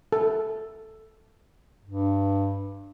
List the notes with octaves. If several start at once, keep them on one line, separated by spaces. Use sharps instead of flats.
A4
G2